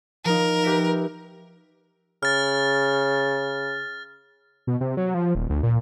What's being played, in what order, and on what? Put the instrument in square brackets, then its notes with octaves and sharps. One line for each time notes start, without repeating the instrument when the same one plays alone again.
[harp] F3 D#4 [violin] A#4
[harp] G4 B4 E5
[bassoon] C#3 [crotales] F6 A6
[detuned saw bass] B2
C3
F#3
F3
D#1
D2
A#2